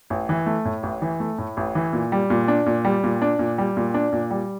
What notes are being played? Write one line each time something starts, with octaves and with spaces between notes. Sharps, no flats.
A1
E3
A3
A2
A1
E3
A3
A2
A1
E3
A#2
G3
A#2
D4
A#2
G3
A#2
D4
A#2
G3
A#2
D4
A#2
G3